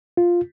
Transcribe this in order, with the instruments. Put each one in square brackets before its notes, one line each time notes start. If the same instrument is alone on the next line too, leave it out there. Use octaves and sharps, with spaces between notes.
[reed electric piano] F4